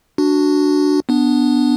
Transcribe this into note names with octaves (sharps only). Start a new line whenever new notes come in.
D4 F#4
B3 D4